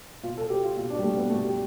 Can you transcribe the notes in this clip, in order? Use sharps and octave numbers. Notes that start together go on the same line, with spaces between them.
B2 F4
A4
G4
F4
B2 F4
D4
G3
A3
B3
B2 A3
G3